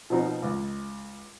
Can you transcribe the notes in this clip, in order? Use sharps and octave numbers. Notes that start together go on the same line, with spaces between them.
B2 F3 C4 D#4
C#2